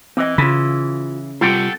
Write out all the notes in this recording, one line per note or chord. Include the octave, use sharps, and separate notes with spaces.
E3 C4 D#5
C#3 F4 B5
C3 G3 F4 A4 F#5 G5